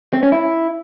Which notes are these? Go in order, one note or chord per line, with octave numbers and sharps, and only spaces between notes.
C4
C#4
E4